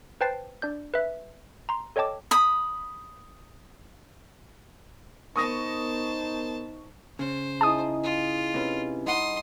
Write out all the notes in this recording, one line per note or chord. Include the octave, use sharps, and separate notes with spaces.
B4 C5 G5 A5 A6 C7
D4 D5 G6
B4 E5
A#5 C6
A4 C#5 D#5 G5 A5 D6
B5 D#6
B3 D#4 A#4 C5 A5 C#6 D#6 A#6
C#3 C5
D#4 E4 G#4 A5 D#6
F4
C3 C#4 B4
G2 D#4 F#5 B5 C6 D#6